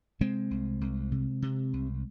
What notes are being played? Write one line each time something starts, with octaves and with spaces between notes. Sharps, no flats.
C3 G#3 C4
C2
C2
C3
C3
C2